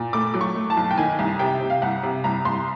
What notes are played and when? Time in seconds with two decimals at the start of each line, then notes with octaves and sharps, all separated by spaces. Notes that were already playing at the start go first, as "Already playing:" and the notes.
Already playing: A#2
0.13 A3 D6
0.34 F#3 D6
0.41 C#6
0.55 A3
0.70 A5
0.77 B1
0.91 G5
0.98 D#3 G#5
1.19 C2
1.39 C3 G5
1.61 C3
1.70 F5
1.82 C2 F#5
2.03 C3
2.24 C2 A#5
2.45 C2 C6